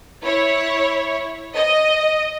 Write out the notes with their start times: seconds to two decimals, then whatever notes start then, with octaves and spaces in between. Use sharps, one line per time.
0.24 E4 C#5
1.55 D#5